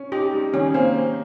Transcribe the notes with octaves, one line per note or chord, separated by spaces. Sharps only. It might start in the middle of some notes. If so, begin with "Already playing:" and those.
Already playing: C#4
D#4 G4
G3
D#3 C#4
A#3 C4